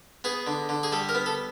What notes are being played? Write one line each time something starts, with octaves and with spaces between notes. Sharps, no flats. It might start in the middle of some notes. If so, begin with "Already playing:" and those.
B3 G#4
D3
D3
G#4
G3 A4
A#4
B3
A4